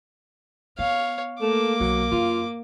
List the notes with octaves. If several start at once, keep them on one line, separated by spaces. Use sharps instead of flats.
B3 C#5 F5
A3 A#3 D6
B1 F#3
F#2 F4